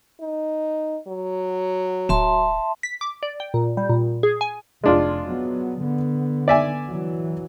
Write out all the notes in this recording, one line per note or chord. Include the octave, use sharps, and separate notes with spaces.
D#4
F#3
D1 E5 A5 C6
B6
D6
D5
G5
A#2
G3
A#2
G#4
G#5
F1 G#3 D4 F4
F#3 B3
D3 B3
D5 E5 G#5
E3 F#3